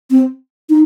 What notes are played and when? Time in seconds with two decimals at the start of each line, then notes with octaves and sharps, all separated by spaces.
0.11 C4
0.70 D#4